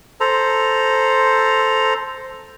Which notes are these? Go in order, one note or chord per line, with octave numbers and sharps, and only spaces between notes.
A4 C5 A#5